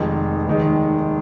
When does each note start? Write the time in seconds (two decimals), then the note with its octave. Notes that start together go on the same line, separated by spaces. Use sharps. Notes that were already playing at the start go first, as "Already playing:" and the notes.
Already playing: F1 F2 D#3 G#3
0.47 F1 D#2 D#3 G#3